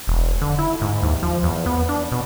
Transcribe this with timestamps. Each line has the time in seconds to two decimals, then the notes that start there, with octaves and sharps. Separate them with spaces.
0.07 E1
0.42 D3
0.59 E4
0.81 G#2
1.03 D#2
1.23 F3
1.43 E2
1.66 B3
1.89 D4
2.12 B2